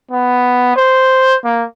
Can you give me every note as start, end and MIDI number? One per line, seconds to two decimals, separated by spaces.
0.11 0.76 59
0.76 1.37 72
1.44 1.64 58